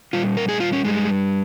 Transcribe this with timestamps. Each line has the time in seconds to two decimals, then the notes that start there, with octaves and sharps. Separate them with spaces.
0.13 A#2 G3 F4
0.37 A#4
0.49 G#4
0.60 F4
0.73 C#4
0.85 G2 G3 G#3